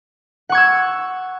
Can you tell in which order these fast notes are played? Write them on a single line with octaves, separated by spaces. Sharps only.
F#5 C#6 G#6 E6